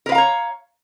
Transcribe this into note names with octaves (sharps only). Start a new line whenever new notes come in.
A#4 B4 C#5 F5 A#5